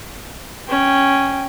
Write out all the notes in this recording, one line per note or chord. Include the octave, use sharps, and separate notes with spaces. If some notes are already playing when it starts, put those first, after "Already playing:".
C#4 G5